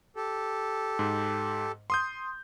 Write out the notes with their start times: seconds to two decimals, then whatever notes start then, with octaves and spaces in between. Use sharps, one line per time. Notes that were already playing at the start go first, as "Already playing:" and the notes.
0.16 G4 A4
0.99 G#2
1.90 C6 D#6 G6